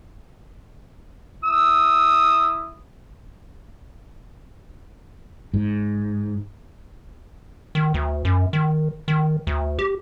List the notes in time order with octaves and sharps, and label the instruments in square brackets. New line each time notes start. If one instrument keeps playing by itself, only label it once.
[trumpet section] E4 D#6 [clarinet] E6
[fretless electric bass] G#2
[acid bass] D#3
D2
F#2
D#3
D#3
D2
G4